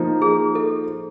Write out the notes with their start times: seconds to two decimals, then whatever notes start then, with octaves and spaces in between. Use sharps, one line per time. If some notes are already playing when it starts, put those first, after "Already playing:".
Already playing: F3 A#3 D#4
0.22 G#4
0.55 A4